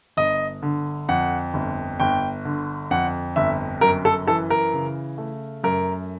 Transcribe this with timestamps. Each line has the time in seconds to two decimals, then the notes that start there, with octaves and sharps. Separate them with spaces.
0.17 G1 D#5
0.63 D3
1.08 F2 F#5
1.54 G1
2.00 G1 G5
2.45 D3
2.91 F2 F#5
3.36 G1 E5
3.81 F#2 A#4
4.05 A4
4.27 E3 A4
4.50 A#4
4.73 C#3
5.18 A3
5.64 F#2 A#4